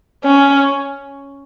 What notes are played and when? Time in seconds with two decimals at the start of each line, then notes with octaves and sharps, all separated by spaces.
0.24 C#4